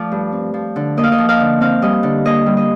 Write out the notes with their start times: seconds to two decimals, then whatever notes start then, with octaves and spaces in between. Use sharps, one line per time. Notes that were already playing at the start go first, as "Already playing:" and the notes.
Already playing: F3 A3 D5
0.12 G2
0.32 C4
0.54 F3
0.76 D3
0.97 A#3 D#5
1.04 F5
1.12 D#5
1.18 F3
1.29 F5
1.40 D3
1.61 C4 F5
1.82 G3 D#5
2.03 D3
2.25 A#3 D#5
2.46 G3
2.57 D#5